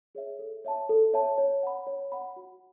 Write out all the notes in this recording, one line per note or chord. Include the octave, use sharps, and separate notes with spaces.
G#4 C#5 E5
A4
C#5 E5 A5
A4
C#5 E5 A5
C#5
F#5 B5
C#5
F#5 B5
F#4